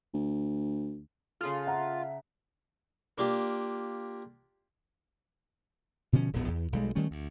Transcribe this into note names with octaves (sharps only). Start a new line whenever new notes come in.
D2
C#3 F4 G#4 A4
E5 F#5 A#5
A#3 D4 F4 G4
B2 D3 F3 C#4
D#1 A#1 A2 B3
E2
B1 G3 G#3
D#3 G3 A3 C#4
D2